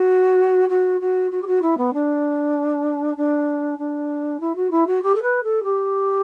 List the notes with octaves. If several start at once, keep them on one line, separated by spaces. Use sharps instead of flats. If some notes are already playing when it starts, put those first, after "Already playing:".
Already playing: F#4
F#4
F#4
F#4
G4
F#4
E4
B3
D4
D4
D4
E4
F#4
E4
F#4
G4
A4
B4
A4
G4